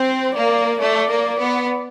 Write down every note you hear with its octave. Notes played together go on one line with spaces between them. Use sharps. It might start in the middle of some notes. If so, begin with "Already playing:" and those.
Already playing: C4 C5
A#3 D5
A3 D5
A#3
B3